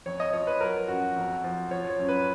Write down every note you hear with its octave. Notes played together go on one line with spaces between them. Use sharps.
F2 C#5
D#5
F3 C#5
B4
F#3 A#4
F#2 F#4
F2
F3
F3 C#5
C#5
F#2
B4